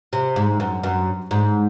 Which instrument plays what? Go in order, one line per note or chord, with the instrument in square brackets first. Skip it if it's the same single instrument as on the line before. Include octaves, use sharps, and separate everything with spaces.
[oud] C3
G#2
F#2
F#2
G#2